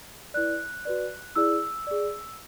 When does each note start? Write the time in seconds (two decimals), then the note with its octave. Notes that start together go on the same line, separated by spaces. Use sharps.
0.34 E4 B4 D5 F#6
0.85 F#4 B4 D5
1.36 E4 G#4 D5 E6
1.87 G#4 D5